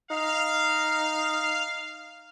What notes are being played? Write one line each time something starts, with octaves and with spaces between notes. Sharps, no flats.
D#4 F5